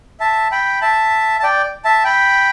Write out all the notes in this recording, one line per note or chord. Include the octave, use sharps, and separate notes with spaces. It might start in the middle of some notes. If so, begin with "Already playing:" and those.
E5 A5
G5 B5
E5 A5
A5
D5 G5
E5 A5
G5 B5